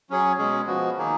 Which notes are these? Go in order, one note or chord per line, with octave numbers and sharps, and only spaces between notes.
F#3 C#4 G#4 C#5
B2 G#3 C#4 G#4
F3 B3 F#4
D#3 A#3 D#4 G#4